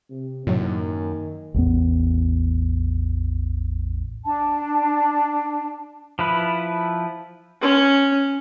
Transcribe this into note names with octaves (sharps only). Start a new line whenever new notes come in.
C3
F#2 A2 C3 D#3 F#3 A#3
A1 E2 B3
D4 A5
F3 E4 B4
C#4